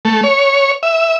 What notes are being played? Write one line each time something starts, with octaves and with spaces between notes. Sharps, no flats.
A3
C#5
E5